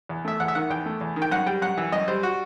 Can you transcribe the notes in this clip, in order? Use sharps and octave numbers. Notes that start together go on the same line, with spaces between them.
E2
A3 E5
E2 F#5
E5
D#3 F#5
E2 G5
A3
E2
D#3
G5
F#2 F#5
G3 G5
F#2 F#5
E3
F#2 D#5
G3 C5
F#4